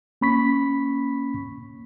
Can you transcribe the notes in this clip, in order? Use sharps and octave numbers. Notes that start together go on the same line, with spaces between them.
A#3 C#4 B5 C#6 B6